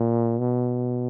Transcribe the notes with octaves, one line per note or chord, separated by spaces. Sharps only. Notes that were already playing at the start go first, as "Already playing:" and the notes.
Already playing: A#2
B2